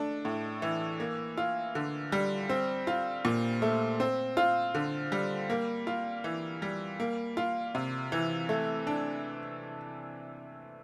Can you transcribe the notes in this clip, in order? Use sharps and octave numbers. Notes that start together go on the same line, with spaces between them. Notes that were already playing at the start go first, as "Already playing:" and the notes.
Already playing: A3 D4
A2
E3
A#3
F4
D3
G3
C4
F4
A#2
A3
C4
F4
D3
G3
A#3
F4
E3
G3
A#3
F4
C3
E3
A3
D4